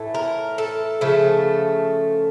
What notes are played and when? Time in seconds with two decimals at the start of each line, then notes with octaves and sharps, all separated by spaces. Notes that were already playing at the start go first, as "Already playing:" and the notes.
Already playing: A2 E3 A3
0.15 A#4
0.58 A4
1.01 C#3 F3 A3